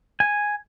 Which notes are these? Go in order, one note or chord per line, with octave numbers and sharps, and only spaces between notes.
G#5